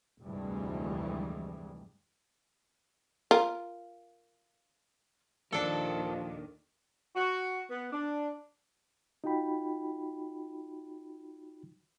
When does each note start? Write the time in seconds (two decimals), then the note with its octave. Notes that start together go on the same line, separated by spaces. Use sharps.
0.24 F1 D2 G2 E3 G3 G#3
3.31 F4 A#4
5.52 D#2 A#2 D#3 F3 D4 A4 A#4 A5
7.16 F#4
7.71 B3
7.93 D4
9.24 D#4 F4 F#4 G5 B5